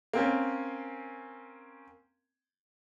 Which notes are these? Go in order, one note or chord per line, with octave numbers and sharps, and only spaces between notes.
A#3 C4 C#4